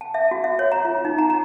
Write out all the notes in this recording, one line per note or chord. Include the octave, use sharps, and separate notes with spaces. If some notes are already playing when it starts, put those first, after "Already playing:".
A5
E5
F#4
E5
C#5
A#5
F4
D#4
A#5
A#5